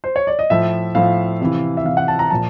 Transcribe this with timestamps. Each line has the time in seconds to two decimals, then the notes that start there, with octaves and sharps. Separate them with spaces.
0.04 C5
0.16 C#5
0.27 D5
0.39 D#5
0.50 A2 F3 E5
0.95 A2 F3 F5
1.41 C3 E3
1.77 E5
1.85 C3 E3 F5
1.97 F#5
2.08 A5
2.19 A#5
2.30 A#2 F3 A5